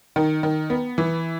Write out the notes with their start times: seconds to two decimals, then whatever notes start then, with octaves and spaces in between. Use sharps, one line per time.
0.16 D#3
0.43 D#3
0.70 B3
0.98 E3